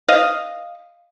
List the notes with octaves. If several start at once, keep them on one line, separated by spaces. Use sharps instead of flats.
D#5 F5